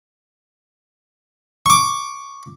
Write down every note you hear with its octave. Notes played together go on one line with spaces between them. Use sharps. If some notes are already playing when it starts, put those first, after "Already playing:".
C#6 D6